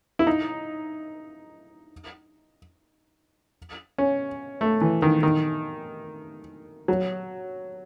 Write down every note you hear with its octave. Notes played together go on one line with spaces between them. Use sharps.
E4
D#4
C#4
A3
E3
D#3
D#3
F#3